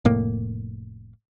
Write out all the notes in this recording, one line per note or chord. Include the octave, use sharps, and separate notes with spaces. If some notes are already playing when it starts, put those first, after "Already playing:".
F1 A2 A#3